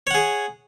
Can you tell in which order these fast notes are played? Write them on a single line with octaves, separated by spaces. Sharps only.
C#5 F#5 G#4